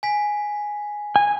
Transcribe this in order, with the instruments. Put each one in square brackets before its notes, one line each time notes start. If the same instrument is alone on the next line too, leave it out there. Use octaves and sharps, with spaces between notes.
[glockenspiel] G#5 B6
[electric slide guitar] G#5